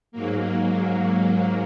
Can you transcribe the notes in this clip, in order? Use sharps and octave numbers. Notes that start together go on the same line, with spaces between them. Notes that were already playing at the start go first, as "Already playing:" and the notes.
G#2 F#3 A#3